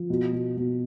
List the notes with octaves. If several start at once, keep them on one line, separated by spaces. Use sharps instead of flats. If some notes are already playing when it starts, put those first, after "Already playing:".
Already playing: F3
B2
B2
B2